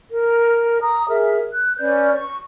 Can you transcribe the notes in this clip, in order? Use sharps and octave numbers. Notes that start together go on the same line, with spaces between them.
A#4
A#5 D#6
G#4 A#4 E5
F#6
C#4 B4 D5 G6
C#6